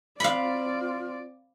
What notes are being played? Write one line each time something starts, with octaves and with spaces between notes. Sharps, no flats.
C4 F4 D5 F5 B5